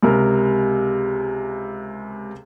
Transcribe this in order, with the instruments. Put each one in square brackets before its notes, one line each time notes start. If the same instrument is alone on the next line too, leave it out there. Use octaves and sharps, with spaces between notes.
[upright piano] C#2 C3 A#4